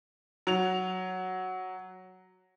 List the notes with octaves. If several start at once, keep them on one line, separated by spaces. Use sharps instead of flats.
F#3 F7